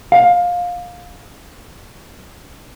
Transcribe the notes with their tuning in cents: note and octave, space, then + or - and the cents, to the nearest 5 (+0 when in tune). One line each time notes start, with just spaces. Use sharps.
F5 +20